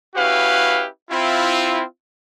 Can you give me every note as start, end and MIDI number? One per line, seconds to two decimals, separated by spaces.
0.15 0.86 61
0.15 0.86 64
0.15 0.86 66
0.15 0.86 67
0.15 0.86 71
0.15 0.86 77
1.09 1.82 60
1.09 1.82 64
1.09 1.82 65